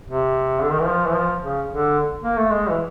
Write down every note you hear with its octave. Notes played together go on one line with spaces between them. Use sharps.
C3
D3
D#3
E3
F3
E3
F3
C#3
D3
A#3
A3
G#3
E3